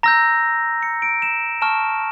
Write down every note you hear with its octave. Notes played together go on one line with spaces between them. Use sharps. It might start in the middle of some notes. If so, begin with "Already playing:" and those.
A#5 E6 G6 A#6
C#7
D7
E7
A5 C#6 F6 E7